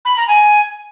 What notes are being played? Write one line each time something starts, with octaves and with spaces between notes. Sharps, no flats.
B5
A#5
G#5